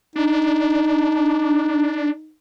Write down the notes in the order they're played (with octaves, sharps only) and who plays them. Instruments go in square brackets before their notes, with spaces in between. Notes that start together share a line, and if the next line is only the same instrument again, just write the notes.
[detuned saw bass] D4 [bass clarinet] D#4